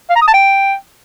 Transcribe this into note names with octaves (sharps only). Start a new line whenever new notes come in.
F5
A#5
D#6
A5
G5